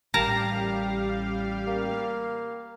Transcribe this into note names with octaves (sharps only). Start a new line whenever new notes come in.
A1 G3 G4 A#4 F5 A5 A#5
A#3